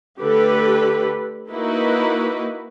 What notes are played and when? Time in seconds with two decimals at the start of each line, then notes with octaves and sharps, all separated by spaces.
0.18 D3 A3 G4 A4 B4
1.51 A#3 D#4 E4 F#4 B4